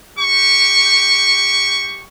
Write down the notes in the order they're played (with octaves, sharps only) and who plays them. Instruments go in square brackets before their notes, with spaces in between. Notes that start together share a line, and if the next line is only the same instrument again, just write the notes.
[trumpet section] G4 C#6